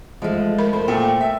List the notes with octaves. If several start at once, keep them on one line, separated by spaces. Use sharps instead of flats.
F3 G#3 A3
A#4 B5
A4 C5
A#2 A3 G5
E5